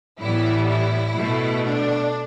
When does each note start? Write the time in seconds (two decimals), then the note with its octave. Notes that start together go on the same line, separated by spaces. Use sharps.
0.19 A2 E3 G3 B3 E4
0.67 E4
1.16 B2 A3
1.64 D4